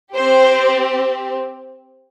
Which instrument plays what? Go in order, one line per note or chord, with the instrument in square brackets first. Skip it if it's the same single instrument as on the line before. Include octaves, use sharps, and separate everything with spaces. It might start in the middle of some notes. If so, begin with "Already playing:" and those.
[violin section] C4 G4 C5